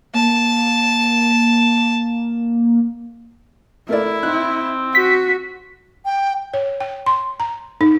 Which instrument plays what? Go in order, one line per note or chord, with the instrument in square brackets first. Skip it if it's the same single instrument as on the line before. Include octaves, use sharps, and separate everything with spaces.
[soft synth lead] A#3 [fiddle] A5
[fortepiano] A3 A#4 D5 [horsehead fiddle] E4
[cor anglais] C4 [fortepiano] D#4 F#6
[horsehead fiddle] F#4 [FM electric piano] B6
[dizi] G5
[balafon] C#5
G5
C6
A#5
D#4